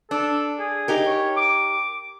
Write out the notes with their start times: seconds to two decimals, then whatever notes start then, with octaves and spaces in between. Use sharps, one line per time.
0.11 D4 A4
0.59 G#4
0.88 D#4 G4 A#4
1.07 C#5
1.37 D6